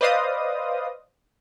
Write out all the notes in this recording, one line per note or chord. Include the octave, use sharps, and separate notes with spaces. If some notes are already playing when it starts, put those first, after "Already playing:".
B4 C5 D5 D#5 F5 D#6